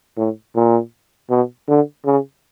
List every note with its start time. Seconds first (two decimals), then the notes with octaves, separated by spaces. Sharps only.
0.17 A2
0.56 A#2
1.30 B2
1.68 D3
2.06 C#3